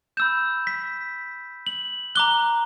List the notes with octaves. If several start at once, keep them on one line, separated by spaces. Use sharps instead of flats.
B5 E6 G6 E7
B6
F#7
A#5 D6 F#6 G7